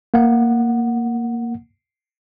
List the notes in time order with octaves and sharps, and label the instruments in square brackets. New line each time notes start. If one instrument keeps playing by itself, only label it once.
[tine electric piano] A#3 F#5